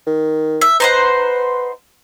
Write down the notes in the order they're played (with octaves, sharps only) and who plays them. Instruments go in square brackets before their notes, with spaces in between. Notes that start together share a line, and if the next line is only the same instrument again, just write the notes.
[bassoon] D#3
[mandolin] E5
[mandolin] D#4 C5 F#5 [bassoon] B4